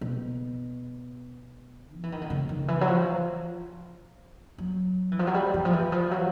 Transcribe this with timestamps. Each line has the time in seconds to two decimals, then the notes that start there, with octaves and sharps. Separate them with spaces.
0.01 B2
1.94 F3
2.03 E3
2.12 D#3
2.21 D3
2.30 C#3
2.49 D#3
2.68 E3
2.81 F#3
2.88 F3
4.58 F#3
5.12 E3
5.19 F3
5.27 F#3
5.34 G3
5.54 E3
5.65 F3
5.73 E3
5.92 F3
6.11 F#3